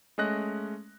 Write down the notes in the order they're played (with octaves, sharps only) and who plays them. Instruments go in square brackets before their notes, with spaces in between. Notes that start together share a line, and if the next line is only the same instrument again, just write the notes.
[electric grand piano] G#3 A3 C#4 D#5 F#6 A#6